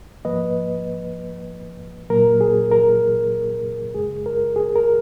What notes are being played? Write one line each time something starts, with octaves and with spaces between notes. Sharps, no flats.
G#2 F3 A#3 B4 D#5
A#2 F#3 A#3 A#4
G#4
A#4
F#2 C#3 G#3 G#4
A#4
G#4
A#4